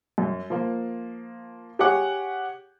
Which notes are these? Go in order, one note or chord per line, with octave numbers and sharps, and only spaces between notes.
F#2
F3 A#3
G4 G#4 C#5 F#5 D6